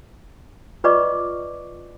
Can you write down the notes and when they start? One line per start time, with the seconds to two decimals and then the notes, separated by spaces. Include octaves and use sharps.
0.84 F4 B4 D5 D#5 C#6 D6